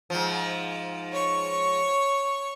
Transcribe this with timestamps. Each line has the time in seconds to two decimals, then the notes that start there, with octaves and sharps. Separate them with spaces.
0.10 G#2 F3
1.12 C#5 C#6